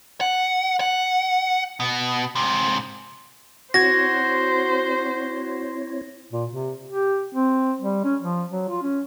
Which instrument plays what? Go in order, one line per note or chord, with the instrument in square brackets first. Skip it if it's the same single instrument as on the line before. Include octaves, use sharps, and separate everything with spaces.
[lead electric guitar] F#5
F#5
B2
G#2 C3
[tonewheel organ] C4 E4 C#5 [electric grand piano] F#4 G#6 [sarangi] C5 [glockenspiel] A#6
[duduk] A#2
C3
G4
C4
G3
C#4
F3
F#3
F4
C#4